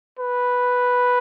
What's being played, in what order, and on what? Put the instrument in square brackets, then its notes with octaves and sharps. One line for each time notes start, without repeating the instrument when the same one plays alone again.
[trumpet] B4